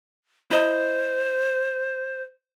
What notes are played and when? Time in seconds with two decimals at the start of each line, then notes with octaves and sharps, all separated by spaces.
0.51 E4 C5 D#5